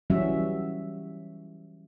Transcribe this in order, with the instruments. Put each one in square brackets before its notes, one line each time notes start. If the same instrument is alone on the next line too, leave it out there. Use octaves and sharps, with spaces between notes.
[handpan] E3 F#3 G3 C#4 F#4 E5